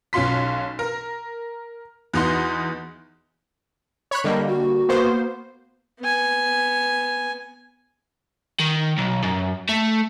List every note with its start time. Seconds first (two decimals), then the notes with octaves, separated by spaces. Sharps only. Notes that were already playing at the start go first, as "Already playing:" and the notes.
0.13 B1 C#4 F4 C6 B6
0.79 A#4
2.13 E2 B3 D#4 F#4 C6
4.11 C#5 B5 F#6
4.24 D3 G3 A#3 D#5
4.48 F#4
4.89 A#3 B3 C5
6.00 B3 G#5
8.60 D#3
8.98 B1
9.24 F#2
9.69 A3